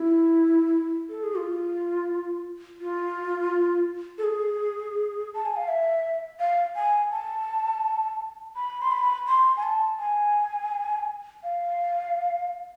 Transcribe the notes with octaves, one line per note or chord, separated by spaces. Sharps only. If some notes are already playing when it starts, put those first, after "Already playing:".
Already playing: E4
A4
G#4
F4
F4
A4
G#4
A5
G#5
F5
E5
F5
G#5
A5
B5
C6
B5
C6
G#5
A5
G#5
F5